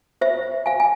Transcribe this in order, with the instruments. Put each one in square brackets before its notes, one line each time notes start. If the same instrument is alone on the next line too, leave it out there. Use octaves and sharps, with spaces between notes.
[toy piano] C5 E5
F5 G#5
G#5